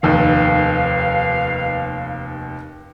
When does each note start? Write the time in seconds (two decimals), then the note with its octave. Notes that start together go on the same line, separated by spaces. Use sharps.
0.03 F1 D#2 B4 F5